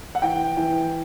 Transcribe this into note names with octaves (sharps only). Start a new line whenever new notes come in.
F#5
E3 G5
E3